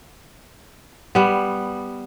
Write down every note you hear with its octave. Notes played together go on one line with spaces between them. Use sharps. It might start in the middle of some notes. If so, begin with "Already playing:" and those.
G3 B3